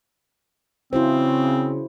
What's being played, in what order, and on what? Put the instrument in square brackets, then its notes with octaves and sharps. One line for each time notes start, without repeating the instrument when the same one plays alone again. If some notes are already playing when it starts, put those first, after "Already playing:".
[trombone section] C#3 [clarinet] C4 [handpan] E4 F#4 C5